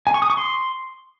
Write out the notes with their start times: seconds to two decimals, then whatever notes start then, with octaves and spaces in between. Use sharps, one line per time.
0.07 G#5
0.14 C#6
0.22 D#6
0.30 C#6
0.37 C6